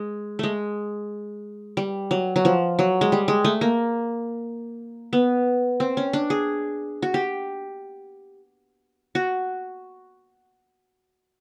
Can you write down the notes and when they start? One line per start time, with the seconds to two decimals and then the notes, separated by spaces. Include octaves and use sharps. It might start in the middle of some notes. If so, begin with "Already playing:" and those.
Already playing: G#3
0.39 G#3 A3
1.77 G3
2.11 F#3
2.36 F#3
2.45 F3
2.79 F#3
3.01 G#3
3.12 G3
3.28 G#3
3.45 A3
3.61 A#3
5.13 B3
5.80 C4
5.97 C#4
6.13 D4
6.30 G#4
7.02 F#4
7.14 G4
9.15 F#4